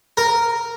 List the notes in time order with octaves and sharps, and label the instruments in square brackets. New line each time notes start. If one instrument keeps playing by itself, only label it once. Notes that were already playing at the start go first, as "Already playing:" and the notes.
[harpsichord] A#4